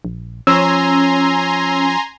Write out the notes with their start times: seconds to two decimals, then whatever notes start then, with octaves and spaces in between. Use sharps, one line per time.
0.05 A#1
0.47 F3 C#4 G#5 A#5 C6 E6